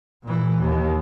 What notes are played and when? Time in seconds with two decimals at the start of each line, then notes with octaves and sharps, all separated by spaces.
0.24 A#2 E3
0.59 D#2